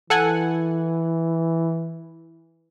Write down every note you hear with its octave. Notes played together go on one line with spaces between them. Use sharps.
E3 A4 F#5 G#5